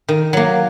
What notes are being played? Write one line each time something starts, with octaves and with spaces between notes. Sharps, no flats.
D#3
F#3 A#3